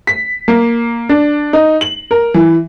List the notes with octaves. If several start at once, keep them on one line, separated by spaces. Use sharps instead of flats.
B6
A#3
D4
D#4
F#7
A#4
E3